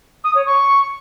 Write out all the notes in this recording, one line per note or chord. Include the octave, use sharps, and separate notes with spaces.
D#6
C#5
C#6